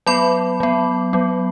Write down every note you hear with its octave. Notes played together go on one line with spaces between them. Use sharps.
F#3 B3 B5
F#3 B3
F#3 B3